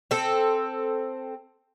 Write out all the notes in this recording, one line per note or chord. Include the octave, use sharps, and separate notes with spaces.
C4 A4